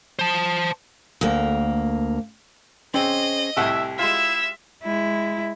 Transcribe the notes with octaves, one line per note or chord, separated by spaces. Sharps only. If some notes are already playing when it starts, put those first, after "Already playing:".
C5 A5
D2 A#3
C4 C#4 G#4 C5 D#5
C2 A2 G4 E5 F#5 G5
G#3 E4 F4 E5 E7
G#3 E4